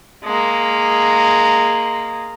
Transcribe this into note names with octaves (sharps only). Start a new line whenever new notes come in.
G#3 A#3